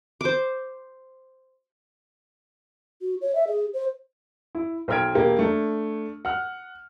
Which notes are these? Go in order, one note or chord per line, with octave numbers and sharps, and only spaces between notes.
C5 D6
F#4
C#5
E5
G#4
C5
E4
B1 C5 G5 F6 G#6 D7
E1 A#3 G4
A3 D4
F#5 F6